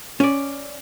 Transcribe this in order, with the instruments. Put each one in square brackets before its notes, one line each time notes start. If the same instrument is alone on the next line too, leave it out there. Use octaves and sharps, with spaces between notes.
[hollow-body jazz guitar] C#4 D5